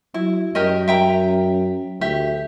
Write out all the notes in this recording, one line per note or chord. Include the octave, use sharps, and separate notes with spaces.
F#3 E4
F#2 G4 A#4 D#5
E5 G5 A#5
D2 G4 E5